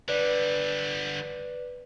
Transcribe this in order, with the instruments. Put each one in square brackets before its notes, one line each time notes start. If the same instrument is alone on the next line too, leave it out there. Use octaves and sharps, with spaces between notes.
[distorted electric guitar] D3 G3 [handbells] B4 D5